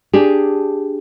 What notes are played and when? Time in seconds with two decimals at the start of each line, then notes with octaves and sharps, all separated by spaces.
0.13 D4 G4 G#4